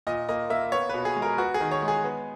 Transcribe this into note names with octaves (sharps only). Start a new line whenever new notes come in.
A#2 D#5
A#3 D#5
A#3 E5
B3 C#5
B2 B4
G#4
G#3
A#4
B3 F#4
G#4
D#3
C#5
G#3
G#4
B3